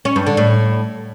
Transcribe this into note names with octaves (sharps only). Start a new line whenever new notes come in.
C#4
G2
D3
A2